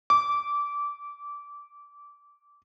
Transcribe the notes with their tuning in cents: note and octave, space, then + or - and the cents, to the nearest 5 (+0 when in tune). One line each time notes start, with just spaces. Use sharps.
D6 -20